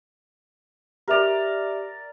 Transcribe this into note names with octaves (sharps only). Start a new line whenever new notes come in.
G4 A#4 D5 E5 F7